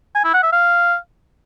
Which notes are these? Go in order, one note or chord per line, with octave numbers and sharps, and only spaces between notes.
G#5
E4
F#5
E5
F5